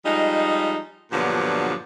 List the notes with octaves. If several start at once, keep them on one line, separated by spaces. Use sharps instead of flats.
F3 G3 G#3 D#4
G2 A#2 D3 F3 F#3 B3